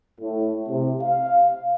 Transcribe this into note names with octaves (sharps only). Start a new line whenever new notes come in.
A2
C3
F5